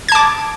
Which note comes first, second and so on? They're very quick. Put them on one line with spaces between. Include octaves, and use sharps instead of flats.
G#6 A5 D6